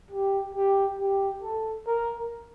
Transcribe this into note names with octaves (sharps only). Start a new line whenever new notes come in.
G4
G4
G4
A4
A#4